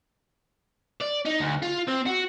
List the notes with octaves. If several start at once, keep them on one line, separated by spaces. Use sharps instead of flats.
D5
D#4
D2
F4
C4
F#4